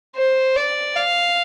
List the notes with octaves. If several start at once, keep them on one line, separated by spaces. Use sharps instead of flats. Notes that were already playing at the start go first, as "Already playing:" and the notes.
C5
D5
F5